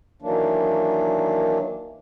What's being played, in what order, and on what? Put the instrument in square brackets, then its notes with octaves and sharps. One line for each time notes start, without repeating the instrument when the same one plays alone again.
[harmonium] D#3 E3 F#3 A#3 D4